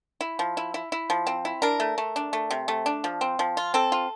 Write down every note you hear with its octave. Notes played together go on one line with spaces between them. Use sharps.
E4
F3
E4
E4
E4
F3
C4
E4
D4 A#4
A3
A3
D4
A3
C3
A3
D4
F3
C4
F3
F4
C4 A4
F4